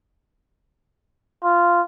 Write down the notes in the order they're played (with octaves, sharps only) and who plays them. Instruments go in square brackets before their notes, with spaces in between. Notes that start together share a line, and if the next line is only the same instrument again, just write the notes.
[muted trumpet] F4